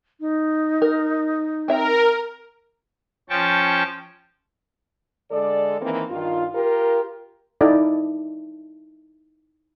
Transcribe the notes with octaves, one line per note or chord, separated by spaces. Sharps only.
D#4
A#4
C4 A#4 E5 A#5
F3 C#4 G5 A5 C#6
D3 G#3 A4 D5
D#3 E3 A#3 C4
G2 D#3 F4
F4 G4 A#4
D#4 E4 A4 D5